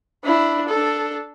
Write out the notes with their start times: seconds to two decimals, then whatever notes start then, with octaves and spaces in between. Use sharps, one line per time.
0.24 D4 E4
0.69 D4 A4